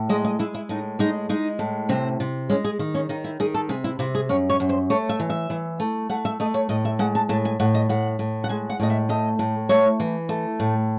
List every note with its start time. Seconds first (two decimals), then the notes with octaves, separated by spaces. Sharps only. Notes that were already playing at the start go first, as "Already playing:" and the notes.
Already playing: A2
0.09 G#3 D#5
0.25 D#5
0.39 G#3 E4
0.54 E4
0.69 A2 D#4
0.99 G#3 D#4
1.29 G#3 D#4
1.59 A2
1.89 C3 C4
2.20 C3
2.50 G#3 C#4
2.65 G#4
2.79 D#3
2.95 C#4
3.09 D#3 D#4
3.24 E4
3.40 D#3 G#4
3.54 A4
3.69 C3 G#4
3.84 E4
3.99 C3 E4
4.15 G#4
4.29 F#2 C#5
4.50 C#5
4.60 F#2
4.69 C5
4.90 A3 C#5
5.09 E5
5.20 E3
5.30 E5
5.50 E3
5.80 A3
6.10 A3 F#5
6.25 E5
6.40 A3 D#5
6.54 C#5
6.69 A2 D#5
6.85 E5
6.99 G#3 F#5
7.15 A5
7.29 A2 A5
7.45 G#5
7.60 A2 F#5
7.74 D#5
7.89 A2 F#5
8.19 A2
8.44 F#5
8.49 G#3 G#5
8.70 F#5
8.80 A2 D#5
8.90 E5
9.09 A3 D#5
9.39 A2
9.69 A3 C#5
10.00 E3
10.29 A3
10.60 A2